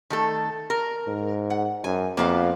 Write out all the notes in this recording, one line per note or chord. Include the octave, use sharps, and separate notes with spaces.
D#3 A3 A4
A#4
G#2
F#5
F#2 G#5
F2 A#3 B3 F5